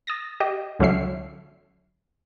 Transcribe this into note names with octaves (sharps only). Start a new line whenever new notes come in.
D#6 A6 A#6
G4 D#5
C#2 D3 F#3 C#4 E5 C7